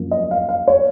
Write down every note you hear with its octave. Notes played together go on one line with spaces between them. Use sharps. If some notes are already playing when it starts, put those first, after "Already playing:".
Already playing: F#2 F3 A#3
D#5
F5
F5
C#5